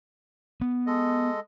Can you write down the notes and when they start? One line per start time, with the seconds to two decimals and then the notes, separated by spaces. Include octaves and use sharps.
0.61 B3
0.87 G#3 A4 D#5